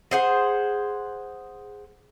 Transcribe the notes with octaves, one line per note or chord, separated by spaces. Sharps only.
G#4 C5 F#5